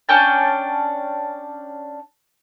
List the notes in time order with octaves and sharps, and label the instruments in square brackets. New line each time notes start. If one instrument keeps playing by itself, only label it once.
[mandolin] C#4 D4 G5 A5